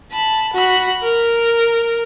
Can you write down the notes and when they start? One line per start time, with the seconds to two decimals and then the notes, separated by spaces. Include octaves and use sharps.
0.12 A5 B5
0.54 F#4 B5
1.04 A#4